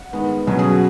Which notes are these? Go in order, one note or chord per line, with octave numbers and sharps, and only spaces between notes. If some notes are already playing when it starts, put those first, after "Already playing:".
Already playing: F#5
D#3 G#3 B3
B2 F#3 C#4 G#5
G#4
F#4